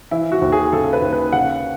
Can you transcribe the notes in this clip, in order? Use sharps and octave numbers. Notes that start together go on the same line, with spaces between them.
E3 E4
F#4
D#2
G#4
C#3 A4
B4
D#2
B4
C#3 F#5